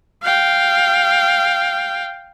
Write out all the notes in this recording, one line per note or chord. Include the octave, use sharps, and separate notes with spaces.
F5 G5